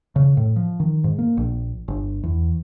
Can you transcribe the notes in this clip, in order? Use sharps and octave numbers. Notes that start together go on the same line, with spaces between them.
C#3
A2
F3
D#3
G#2
A#3
A#1
G1
E2